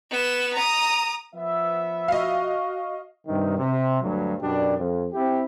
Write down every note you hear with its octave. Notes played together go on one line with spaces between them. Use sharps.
B3 E7
A#5 D#6
F3 B3 E5
F#4 D#5 F5
G2 C3 D#3
C3
D2 G2 F#3
F#2 B2 D4 G4 D5
F2
C4 E4 G4